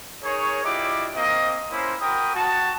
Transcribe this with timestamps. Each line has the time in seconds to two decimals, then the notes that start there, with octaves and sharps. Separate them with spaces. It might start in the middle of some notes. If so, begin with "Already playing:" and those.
0.23 D#4 G#4 A#4 C#5
0.64 D4 E4 F4 G4 D#5 D6
1.15 A#3 C4 D#5
1.71 A#3 C#4 E4 C5
2.01 F#4 A#4 G5 B5 D#6
2.35 F#4 A5